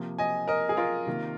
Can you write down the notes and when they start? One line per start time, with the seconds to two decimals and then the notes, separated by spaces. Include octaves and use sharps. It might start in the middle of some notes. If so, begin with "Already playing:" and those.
Already playing: C3 F3 A#3
0.18 D#5 G#5
0.48 A#4 D#5
0.69 G#4
0.77 F4 A#4
1.07 C3 D#3 A#3